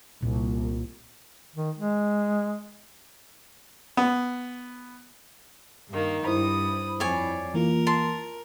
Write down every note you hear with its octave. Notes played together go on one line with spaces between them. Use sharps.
C2 A#2
D#3
G#3
B3
G2 D#3 A#3
G2 E4 C5 B5 D#6
F2 C#5 D5 G#5
E3 A#3 F4 A#4
A5 C6